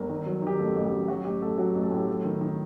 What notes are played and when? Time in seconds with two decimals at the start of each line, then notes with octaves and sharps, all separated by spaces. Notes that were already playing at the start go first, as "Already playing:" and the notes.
Already playing: G1 A#4
0.10 D#3
0.26 F#3
0.42 D#3 G4
0.59 A1 A4
0.76 A1
0.85 G4
0.92 F#3
1.08 F#3 F#4
1.25 A1 G4
1.42 A1 A4
1.58 F#3 F#4
1.75 A1
1.83 A4
1.91 A2
1.96 G4
2.07 F#3 A4
2.24 D#3
2.41 D#3